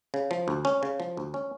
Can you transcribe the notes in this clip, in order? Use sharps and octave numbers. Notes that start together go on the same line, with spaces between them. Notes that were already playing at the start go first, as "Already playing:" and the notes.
C#3
F3
D2
C#4
C#3
F3
D2
C#4